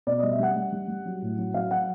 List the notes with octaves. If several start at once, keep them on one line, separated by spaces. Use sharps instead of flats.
B2 D5
G3 D#5
E5
G3 F#5
G3
G3
G3
F#3
A2
F#3
F#3 F5
F#3 F#5